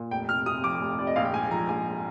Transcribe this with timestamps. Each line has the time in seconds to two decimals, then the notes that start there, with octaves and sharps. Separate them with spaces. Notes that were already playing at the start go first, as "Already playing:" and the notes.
Already playing: A#2
0.11 F1 G5
0.29 C3 F6
0.46 C3 D#6
0.64 F2 D6
0.81 F1
0.99 F1 D5
1.07 D#5
1.16 A#1 F5
1.25 G5
1.34 G#2 G#5
1.51 F3 A#5
1.69 A#1 G#5